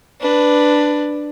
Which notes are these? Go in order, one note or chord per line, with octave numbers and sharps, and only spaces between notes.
D4 B4